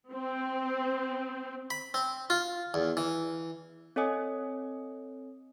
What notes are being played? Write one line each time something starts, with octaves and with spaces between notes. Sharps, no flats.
C4
B5
C4
F4
E2
E3
C4 A4 C#5 D#5 G#5 D#6